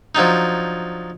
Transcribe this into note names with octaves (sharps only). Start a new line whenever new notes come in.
F3 F#3 D4 D#4